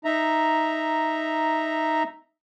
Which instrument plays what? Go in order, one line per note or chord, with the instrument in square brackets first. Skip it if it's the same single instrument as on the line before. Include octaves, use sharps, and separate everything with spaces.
[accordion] D#4 E5 A#5